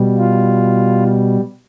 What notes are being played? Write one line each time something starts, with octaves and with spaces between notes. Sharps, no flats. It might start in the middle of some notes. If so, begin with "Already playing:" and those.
Already playing: B2 G3
F4